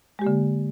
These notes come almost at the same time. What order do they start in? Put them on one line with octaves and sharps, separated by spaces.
G#3 G4 A#3 D3